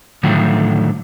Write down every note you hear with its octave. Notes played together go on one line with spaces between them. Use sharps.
A2 D3 D#3 F3 F#3 A3